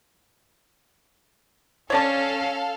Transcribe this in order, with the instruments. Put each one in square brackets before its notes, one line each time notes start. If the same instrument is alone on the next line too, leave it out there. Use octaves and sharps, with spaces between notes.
[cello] C#4 [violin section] A4 F5 [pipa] C#5 D5 A5